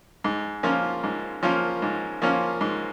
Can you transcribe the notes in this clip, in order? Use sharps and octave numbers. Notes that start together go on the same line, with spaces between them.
G#2
F3 A#3 C#4 F4
G#2
F3 A#3 C#4 F4
G#2
F3 A#3 C#4 F4
G#2